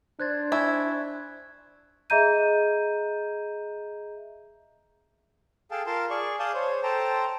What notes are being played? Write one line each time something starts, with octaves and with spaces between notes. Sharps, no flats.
D4 C5 F#6 G#6 A6
E4 G#5 C#6 G#6
G#4 D#5 E5 A#5 G6 D#7
G#4 A4 F5 G5 A5
F4 A#4 F5 A5 C6
G#4 D5 C#6
G#4 D5 F5 A5 D#6 G6
C5 C#5
A4 C5 G5 A5 A#5